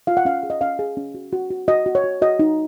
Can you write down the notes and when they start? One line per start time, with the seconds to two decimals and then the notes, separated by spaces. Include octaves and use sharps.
0.07 F4 F5
0.17 F#5
0.25 C#4 F5
0.43 G#4
0.50 D#5
0.61 C#4 F5
0.79 G#4
0.97 C#4
1.15 F#4
1.33 F#4
1.50 F#4
1.68 F#4 D#5
1.86 F#4
1.95 C#5
2.04 F#4
2.22 F#4 D#5
2.39 D#4